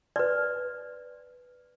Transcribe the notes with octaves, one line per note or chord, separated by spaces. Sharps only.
B4 D5